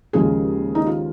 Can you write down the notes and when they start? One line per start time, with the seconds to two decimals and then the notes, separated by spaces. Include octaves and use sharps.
0.13 D#2 C#3 F3 G#3 G#4
0.75 D#4
0.87 F4